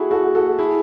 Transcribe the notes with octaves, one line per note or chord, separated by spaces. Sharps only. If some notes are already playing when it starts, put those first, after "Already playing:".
Already playing: E4 F#4 G#4 A4
F#4 A4
F#4 A4
E4 G#4